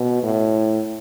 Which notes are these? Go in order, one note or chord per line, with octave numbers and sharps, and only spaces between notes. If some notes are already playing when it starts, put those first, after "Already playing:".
Already playing: B2
A2